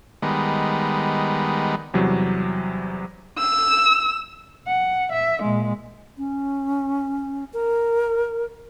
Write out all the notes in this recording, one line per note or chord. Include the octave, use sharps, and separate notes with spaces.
D#3 G3 G#3 B3
E2 C3 F#3 G3
E6
F#5
E5
A#2 G#3
C#4
A#4